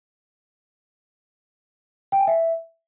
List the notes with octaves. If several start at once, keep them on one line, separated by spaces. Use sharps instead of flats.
G5
G#5
E5